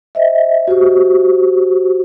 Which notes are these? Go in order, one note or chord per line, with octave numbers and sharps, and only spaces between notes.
C5 D#5 E5
F#4 G4 C5